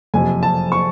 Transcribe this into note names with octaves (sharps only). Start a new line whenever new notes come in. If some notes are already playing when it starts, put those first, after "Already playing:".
F#1 F2 C3 G#5
A5
C#6